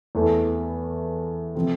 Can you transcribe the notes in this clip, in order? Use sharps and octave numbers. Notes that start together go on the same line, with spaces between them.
E2 E3 A3
C3 F3 A3 C4 F4